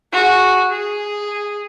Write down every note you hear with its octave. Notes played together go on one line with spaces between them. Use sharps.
F#4 G#4
G#4